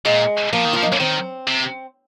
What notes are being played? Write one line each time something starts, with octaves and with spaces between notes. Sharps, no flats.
A#2 G#3
F3 A#3
D#3
F3 F4
D#4
C#4
D#3 C4
C3